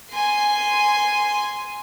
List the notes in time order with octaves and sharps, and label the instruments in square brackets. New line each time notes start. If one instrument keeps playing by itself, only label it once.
[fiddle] G#5 C6